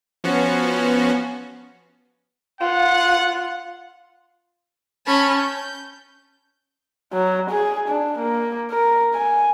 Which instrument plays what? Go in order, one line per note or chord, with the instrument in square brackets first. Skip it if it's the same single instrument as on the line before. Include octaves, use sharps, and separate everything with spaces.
[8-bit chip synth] F3 C#4 F#4 [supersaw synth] B3
[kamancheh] F4 [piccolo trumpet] F#5
[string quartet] C#4 A5 B5
G6
[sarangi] F#3
G#4
D4
A#3
A#4
G#5